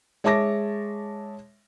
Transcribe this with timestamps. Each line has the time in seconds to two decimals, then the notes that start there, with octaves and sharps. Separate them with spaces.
0.24 G#3 C#5 E5 A5 D6 A#6